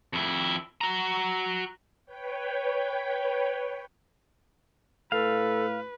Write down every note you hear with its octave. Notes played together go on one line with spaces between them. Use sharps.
F2 E4
F#4 A#5
B4 C#5 G5
A2 A4 B4 F5